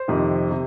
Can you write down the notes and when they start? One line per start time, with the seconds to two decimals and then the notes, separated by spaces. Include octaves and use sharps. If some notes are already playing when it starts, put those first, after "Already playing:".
Already playing: C5
0.08 F2 C3 D#3
0.51 C3